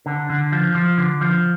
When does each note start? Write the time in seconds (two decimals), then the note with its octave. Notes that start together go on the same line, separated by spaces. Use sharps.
0.06 D3
0.30 D3
0.52 F3
0.75 F3
0.98 D3
1.21 F3